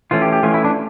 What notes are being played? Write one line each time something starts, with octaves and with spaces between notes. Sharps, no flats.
E3 A3 C#4 F4
G4
G4
E3 A3 C#4 F4
E4
D4